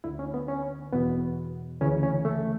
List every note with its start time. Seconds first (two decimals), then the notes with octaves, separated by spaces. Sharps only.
0.04 D2 D3 E4
0.19 C#4
0.34 B3
0.48 C#4
0.92 E2 B2 B3
1.81 D2 C#3 E3 C#4
2.03 C#4
2.25 A3